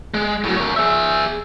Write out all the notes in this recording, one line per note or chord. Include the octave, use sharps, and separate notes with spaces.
G#3
A2 F#3
A#4 C#5
G#4 E5